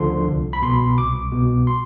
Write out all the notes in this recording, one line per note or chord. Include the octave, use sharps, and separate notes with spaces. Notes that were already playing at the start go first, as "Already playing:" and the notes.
Already playing: D2 D3 F3 C6
C2
B5
B2 C6
C2 D6
B2
C6